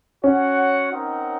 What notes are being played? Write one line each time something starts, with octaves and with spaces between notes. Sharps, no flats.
C#4 F#4 C#5 F#5
C4 D#4 A#4 D#5 F#5